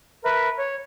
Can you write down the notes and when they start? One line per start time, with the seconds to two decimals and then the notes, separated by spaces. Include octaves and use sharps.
0.24 A#4 B4 E5
0.57 C#5